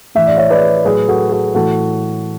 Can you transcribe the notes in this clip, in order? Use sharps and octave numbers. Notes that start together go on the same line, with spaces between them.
A2 E3 E5
D5
C#5 E5
B4 D5
A2 F#3 G#4 B4
F#4 A4
F#4 A4
A2 E3 F#4 A4